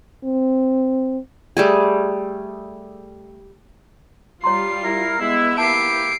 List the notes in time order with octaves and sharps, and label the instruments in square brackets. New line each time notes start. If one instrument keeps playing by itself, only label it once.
[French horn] C4
[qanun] G3 A3 G#4
[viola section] G3 F4 [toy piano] C#5 A#5 C6 [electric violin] C7
[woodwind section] E4 A#4
[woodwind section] G#3 E4 [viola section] B3 E5
[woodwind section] A#3 E4 G4 [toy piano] A5 [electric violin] C7 D7